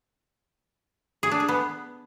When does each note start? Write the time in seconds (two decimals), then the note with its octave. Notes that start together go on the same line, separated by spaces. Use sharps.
1.23 G#4
1.31 D4
1.40 G#4
1.48 B3